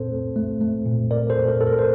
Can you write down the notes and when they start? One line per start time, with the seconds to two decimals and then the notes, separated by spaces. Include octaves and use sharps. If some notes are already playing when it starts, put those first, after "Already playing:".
Already playing: A#2 C4 A4 C5
0.11 A3
0.36 A3
0.61 A3
0.86 A#2
1.11 A#2 A#4 D5
1.30 A4 C5
1.36 A#2
1.48 A#4
1.61 A#2 A4
1.67 A#4
1.79 C5